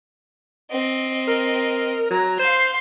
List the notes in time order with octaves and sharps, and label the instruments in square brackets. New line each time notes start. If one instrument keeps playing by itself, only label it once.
[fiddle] C4 D#5
[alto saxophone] A#4
[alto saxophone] F#3 [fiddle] A#5
[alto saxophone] C5 [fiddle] F5 C6